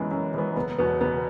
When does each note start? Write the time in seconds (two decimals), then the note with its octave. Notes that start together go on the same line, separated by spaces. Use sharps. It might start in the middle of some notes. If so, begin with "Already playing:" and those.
Already playing: F#2 E3 G#3 B3 C#4
0.11 F#2
0.34 E3 G#3 B3
0.56 F#1 B3
0.78 E2 B2 B3
1.01 F#1 B3